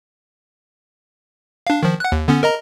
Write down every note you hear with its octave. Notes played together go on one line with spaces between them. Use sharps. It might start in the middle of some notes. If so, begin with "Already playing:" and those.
D4 F5
D#3 F3
F#5 F#6
D#2
D3 B3 C#4
A#4 D#5 A#5